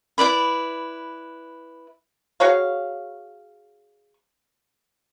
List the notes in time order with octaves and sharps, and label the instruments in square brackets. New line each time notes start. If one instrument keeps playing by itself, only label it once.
[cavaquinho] E4 B4 D5 B5
[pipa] F#4 G#4 C#5 F5